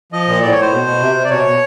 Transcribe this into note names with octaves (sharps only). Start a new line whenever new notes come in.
F3 D#5
A#2
A2 D5
C#5
A2 C5
B2
B2
C3
C3
D5
B2 C#5
B2